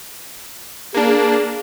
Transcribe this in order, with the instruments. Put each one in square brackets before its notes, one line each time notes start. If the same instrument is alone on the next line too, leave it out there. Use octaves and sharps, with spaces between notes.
[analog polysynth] A#3 D4 [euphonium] G#4